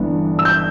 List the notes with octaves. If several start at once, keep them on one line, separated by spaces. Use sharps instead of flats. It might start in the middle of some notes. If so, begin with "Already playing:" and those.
Already playing: G1 G2 E3 B3 D4
E6
G6